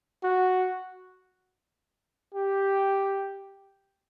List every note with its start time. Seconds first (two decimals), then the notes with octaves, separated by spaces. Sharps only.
0.23 F#4
2.34 G4